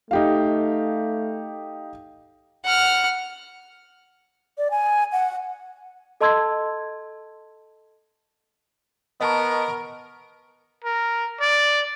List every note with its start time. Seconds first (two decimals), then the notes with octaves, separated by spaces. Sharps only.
0.11 A3 D#4 G4 F5
2.65 F#5 F6
4.58 D5
4.71 G#5
5.12 F#5
6.21 A4 D#5 A5 C6 E6 G#6
9.21 B3 A#4 D#5 A5 C#6
10.84 A#4
11.41 D5